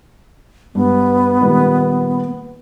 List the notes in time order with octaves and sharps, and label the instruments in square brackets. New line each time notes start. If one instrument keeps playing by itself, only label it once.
[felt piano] G2 D4 [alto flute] B3
[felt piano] A#2 D#3 G3